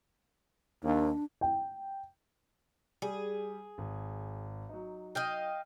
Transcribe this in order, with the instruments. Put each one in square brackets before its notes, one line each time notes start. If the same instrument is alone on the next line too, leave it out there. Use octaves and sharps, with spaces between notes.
[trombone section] D#2 [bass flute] D4
[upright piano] G5
[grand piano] G3 [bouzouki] G#4
[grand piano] G#1
F#3 D#4
[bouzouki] D#5 F5 G5